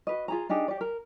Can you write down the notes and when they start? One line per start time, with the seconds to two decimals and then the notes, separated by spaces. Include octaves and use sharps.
0.07 F#4 B4 D#5
0.28 F4 G#4 A#5
0.49 D4 D#4 G4 G#4
0.68 G4 D5
0.81 A#4